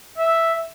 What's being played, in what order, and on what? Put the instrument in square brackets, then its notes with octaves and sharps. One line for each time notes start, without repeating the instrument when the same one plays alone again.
[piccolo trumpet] E5